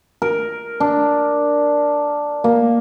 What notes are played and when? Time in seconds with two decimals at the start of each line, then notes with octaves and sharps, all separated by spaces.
0.22 A#4
0.80 D4
2.44 A#3